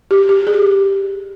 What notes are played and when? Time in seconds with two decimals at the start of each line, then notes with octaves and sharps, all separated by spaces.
0.11 G4
0.29 G4
0.47 G#4